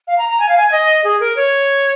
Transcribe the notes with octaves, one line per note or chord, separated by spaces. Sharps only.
F5
A#5
A#5
G#5
F5
G#5
D#5
G#4
A#4
C#5